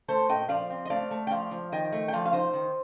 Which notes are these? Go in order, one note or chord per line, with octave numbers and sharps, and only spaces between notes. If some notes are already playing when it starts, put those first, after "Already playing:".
A3 A4 C5
A#2 D#5 G5
F3 D5 F5
C4
D#5
A3 D5 F5
A3
G5
F3 D5 F5
F3
D#3 D#5 G5
A3
G5
F3 D5 F5
F5
D#4 C5 D#5
D#3